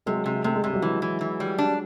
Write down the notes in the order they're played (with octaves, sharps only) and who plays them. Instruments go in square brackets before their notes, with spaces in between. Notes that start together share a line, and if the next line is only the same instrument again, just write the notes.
[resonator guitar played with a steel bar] C3 [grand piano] F#3 G#3
[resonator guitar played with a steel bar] C3
[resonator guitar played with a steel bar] C3 [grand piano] A3
[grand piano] G#3
[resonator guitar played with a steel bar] C3 [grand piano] G3
[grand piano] F#3 G#3
[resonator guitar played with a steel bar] E3
E3
E3
G3
D4